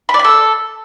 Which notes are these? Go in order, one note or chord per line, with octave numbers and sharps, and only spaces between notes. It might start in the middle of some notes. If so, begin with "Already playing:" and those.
B5
D5
B5
A4